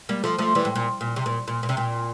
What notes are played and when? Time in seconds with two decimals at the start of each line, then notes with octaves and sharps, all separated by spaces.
0.09 G3 A#3
0.24 F3 A3
0.38 F3 A3
0.55 E3 G3
0.65 A2
0.76 A#2
1.01 A#2
1.16 C3
1.26 A#2
1.48 A#2
1.63 A#2
1.69 C3
1.77 A#2